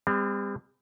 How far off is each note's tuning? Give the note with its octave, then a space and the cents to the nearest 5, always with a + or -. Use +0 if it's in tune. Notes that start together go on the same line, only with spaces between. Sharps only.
G3 +40 C4 -30